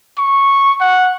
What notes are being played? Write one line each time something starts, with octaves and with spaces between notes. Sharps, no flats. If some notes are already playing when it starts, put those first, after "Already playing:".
C#6
F#5